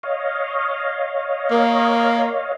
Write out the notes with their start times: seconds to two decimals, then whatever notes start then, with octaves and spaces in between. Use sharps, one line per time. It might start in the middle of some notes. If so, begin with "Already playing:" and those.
0.03 C#5 D#5 F5
1.51 A#3